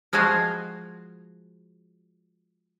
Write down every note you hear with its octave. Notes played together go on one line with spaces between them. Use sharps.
F3 G#3 F#4 G#4 F5